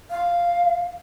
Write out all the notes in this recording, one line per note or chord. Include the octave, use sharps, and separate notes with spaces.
F5